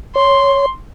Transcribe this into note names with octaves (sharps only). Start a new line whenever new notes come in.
C#5 C6